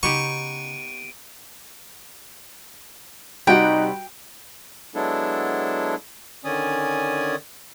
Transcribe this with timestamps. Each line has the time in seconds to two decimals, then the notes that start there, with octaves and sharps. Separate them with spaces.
0.03 C#3 B3 D#4 G4 C#6 D7 D#7
3.47 C3 G3 D#4 F#4 F#5 G5
4.95 F#3 G#3 B3 D4 E4 A4
6.45 D3 D#3 C#4 D5 G#5 D#6